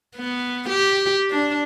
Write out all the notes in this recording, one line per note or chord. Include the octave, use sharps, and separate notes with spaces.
B3
G4
D4